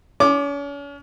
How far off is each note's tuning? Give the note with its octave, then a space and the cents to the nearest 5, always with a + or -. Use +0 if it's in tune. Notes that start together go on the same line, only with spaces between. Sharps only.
C#4 +40 D6 +5